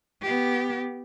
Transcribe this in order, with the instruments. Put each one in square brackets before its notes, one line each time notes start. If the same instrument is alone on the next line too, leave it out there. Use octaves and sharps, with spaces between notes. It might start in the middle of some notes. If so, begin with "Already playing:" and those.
[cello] B3 G4